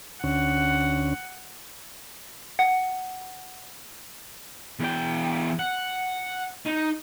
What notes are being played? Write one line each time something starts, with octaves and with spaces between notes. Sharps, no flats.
D2 C#4 F#5
F#5
E2 G5
F#5
D#4